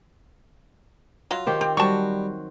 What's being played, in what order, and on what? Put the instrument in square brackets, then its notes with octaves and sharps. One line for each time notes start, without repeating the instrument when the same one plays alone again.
[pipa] F#3 [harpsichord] F4
[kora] D#3 G4 C5
[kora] C4 [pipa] G4
[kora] F#3 F#4 C5 [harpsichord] G3 [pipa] A5 C#6